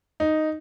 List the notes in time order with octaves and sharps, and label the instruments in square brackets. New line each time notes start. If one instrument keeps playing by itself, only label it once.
[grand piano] D#4